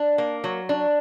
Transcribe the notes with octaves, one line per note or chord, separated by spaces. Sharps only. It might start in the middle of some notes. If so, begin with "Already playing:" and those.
Already playing: D4
A#3
F#3
D4